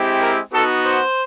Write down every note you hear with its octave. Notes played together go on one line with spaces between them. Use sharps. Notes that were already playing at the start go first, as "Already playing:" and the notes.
Already playing: G#3 C4 E4 G4
A#4
B3 D#4 F#4 A4
C5